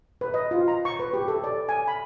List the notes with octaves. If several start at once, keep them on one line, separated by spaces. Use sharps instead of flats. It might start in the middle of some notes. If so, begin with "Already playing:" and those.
B4
D#5
F4
A#5
C#6
B4
G4
A4
D5
G#5
B5